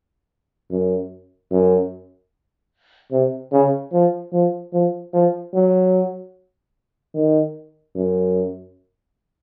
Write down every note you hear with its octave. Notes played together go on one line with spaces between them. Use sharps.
F#2
F#2
C3
C#3
F3
F3
F3
F3
F#3
D#3
F#2